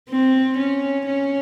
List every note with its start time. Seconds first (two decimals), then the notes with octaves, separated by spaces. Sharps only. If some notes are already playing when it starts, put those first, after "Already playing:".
0.11 C4
0.57 C#4
1.05 C#4